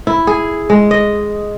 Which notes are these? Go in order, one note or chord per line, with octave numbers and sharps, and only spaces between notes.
E4
G#4
G#3
D#5